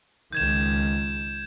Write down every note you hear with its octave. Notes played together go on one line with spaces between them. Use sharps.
C#2 D#3 G6 G#6 E7